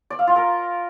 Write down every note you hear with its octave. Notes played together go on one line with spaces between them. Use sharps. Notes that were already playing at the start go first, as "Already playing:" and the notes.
D5
F5
F4
A#4